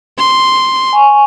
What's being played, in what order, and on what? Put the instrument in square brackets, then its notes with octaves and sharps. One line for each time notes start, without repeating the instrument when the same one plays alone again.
[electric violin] C6
[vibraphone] G#5 C#6